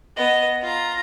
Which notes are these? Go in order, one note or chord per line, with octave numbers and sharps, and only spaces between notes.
B3 D#5
F4 A#5